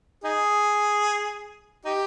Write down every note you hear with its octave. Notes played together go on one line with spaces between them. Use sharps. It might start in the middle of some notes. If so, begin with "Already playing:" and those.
D#4 G#4
D#4 G4